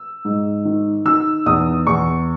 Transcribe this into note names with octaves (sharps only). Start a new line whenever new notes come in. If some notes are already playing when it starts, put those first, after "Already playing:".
Already playing: E6
G#2
D#3
D#3 E6
E2 D#6
E2 C#6